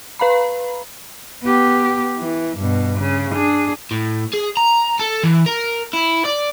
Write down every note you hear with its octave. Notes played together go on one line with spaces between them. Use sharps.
B4 F5 A#5 B5
B3 G4
E3
G2 B2
C#3
D4 G#4
A2
G#4
A#5
A4
E3
A#4
E4
D5